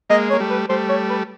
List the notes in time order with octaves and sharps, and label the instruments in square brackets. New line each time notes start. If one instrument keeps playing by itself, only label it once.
[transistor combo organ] G#3 A#3 [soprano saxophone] D#5
[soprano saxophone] C#5
[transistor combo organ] A#3
G3 A3
[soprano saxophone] B4
[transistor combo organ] G3 A3 [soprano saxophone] C5
[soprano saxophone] C#5
B4